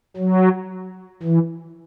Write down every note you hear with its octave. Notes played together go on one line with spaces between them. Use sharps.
F#3
E3